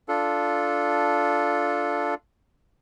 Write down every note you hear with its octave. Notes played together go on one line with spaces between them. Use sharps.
D4 F4 A4